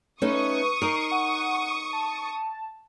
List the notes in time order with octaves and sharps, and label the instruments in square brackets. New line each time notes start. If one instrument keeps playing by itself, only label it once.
[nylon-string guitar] A3 C#4 D#4 [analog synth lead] B4 [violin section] C#6 D#6
[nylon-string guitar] D#4 A#4 [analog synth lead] C7
[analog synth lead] F#5
A5